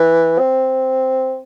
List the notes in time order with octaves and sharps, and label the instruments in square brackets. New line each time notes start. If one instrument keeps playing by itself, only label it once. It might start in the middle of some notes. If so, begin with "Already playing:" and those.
Already playing: [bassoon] E3
C4